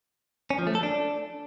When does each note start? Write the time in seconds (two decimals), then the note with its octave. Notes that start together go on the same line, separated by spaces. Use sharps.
0.50 C#4
0.59 F3
0.67 A3
0.75 A4
0.83 D4